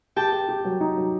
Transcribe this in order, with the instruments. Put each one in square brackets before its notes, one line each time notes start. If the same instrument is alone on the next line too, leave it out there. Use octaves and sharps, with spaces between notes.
[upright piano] G4 [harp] G5 A5
[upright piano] G4
G4
F#3
D#4
F#3